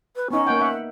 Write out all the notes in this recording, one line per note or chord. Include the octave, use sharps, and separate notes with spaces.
B4
B3 C#4 D#4
A#3 F#5 G5
E5 F#5 B5